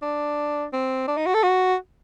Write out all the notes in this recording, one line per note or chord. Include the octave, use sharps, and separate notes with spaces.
D4
C4
D4
D#4
F#4
A4
F#4